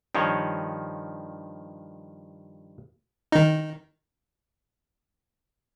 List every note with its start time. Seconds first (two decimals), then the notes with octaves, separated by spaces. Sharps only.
0.15 G2 D#3 F3 C#5
3.32 D#3 D#4